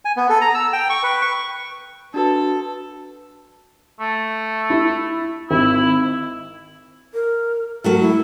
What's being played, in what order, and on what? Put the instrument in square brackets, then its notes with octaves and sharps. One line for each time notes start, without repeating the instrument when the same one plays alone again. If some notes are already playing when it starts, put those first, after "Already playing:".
[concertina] G#5
B3
A4
A#5
E6
G5
C#6
B4
C#6
[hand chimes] D4 F#4 B4 [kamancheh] A4
[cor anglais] A3
[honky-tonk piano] E4
[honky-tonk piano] G#1 [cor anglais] E4
[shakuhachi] A#4
[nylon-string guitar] F#3 A3 F#4 [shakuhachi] A#4
[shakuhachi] E4